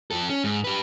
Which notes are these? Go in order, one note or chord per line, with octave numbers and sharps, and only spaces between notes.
F2 A4
C#4
G#2
G4 B4